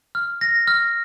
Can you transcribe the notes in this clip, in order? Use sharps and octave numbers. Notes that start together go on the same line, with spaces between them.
F6
A#6
F6